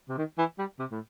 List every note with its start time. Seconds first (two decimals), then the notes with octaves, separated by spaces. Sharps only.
0.09 C3
0.17 D#3
0.38 E3
0.58 G3
0.79 C3
0.91 A2